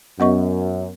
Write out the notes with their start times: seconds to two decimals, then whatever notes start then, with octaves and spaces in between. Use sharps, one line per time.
0.20 F#2 B3 D#5 C#6